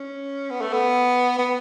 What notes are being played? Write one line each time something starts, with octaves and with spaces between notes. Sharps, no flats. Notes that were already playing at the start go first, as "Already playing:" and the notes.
Already playing: C#4
B3
A3
B3
B3